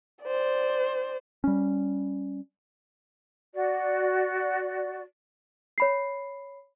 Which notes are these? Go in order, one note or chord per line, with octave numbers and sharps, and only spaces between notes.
C5 D5
G3 C#4
F#4 D5
C#5 B5 C7